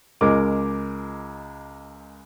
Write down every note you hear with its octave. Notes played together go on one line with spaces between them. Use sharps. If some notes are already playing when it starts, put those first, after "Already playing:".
C#2 G#3 A#4 D6